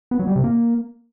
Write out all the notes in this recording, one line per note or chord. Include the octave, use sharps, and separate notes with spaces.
B3
F#3
G3
C3
A#3